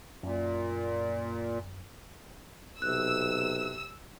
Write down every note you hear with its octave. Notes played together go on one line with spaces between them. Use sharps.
F#2 A#2
B1 C3 E6 F#6